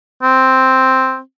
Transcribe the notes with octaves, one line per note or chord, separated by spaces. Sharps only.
C4